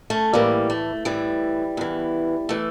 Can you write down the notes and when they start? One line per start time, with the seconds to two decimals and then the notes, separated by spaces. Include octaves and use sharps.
0.10 A3 C#4
0.33 A2 E3 G3 A#3
0.70 A3
1.05 A2 E3 G3
1.77 E2 E3
2.49 E3 A3